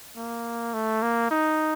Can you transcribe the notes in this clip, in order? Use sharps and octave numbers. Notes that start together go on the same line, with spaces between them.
A#3
A3
A#3
D#4